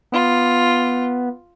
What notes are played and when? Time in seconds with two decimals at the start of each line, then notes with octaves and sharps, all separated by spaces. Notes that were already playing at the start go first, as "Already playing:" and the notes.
0.12 B3 F4